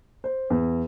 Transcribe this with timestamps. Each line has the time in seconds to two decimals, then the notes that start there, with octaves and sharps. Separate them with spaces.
0.24 C5
0.50 E2